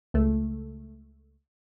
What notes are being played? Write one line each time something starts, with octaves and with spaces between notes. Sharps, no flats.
C#2 A3